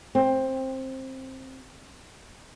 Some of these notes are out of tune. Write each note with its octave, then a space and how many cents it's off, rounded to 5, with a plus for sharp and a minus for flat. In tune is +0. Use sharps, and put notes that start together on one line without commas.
C4 +15